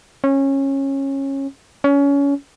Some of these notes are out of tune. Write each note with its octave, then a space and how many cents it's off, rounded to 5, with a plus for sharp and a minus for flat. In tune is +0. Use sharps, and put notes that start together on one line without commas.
C#4 -20
C#4 +25